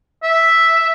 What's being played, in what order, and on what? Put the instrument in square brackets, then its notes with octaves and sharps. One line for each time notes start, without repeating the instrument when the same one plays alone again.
[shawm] E5